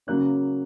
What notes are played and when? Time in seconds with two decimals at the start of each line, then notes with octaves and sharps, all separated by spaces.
0.07 C#3 F#3 A#3 C#4 F#6